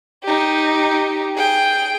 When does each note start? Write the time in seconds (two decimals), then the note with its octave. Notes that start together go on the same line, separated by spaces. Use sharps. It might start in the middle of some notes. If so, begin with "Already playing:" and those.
0.24 D#4 G4
1.36 G#4 G5